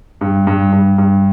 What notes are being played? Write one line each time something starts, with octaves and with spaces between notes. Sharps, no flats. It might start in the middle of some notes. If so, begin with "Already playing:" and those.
G2
G2
G2
G2